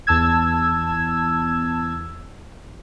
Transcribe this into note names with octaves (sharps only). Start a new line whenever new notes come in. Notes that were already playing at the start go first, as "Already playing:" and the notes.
E2 A5 E6 G#6